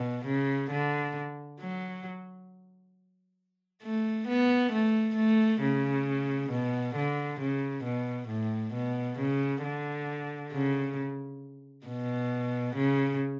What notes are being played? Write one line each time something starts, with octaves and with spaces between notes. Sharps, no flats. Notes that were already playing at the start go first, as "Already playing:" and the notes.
Already playing: B2
C#3
D3
F#3
A3
B3
A3
A3
C#3
B2
D3
C#3
B2
A2
B2
C#3
D3
C#3
B2
C#3